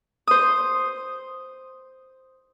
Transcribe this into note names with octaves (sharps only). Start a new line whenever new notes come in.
C5 D#6